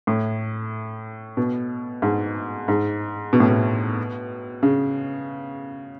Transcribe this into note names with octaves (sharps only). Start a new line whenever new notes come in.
A2
B2
G#2
G#2
B2
A2
B2
C#3